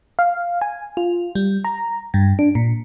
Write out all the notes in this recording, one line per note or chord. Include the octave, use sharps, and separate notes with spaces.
F5
G#5
F4
G3
A#5
G2
D4
A#2